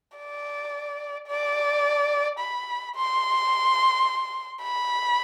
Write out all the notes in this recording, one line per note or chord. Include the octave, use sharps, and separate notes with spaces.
D5
D5
B5
C6
B5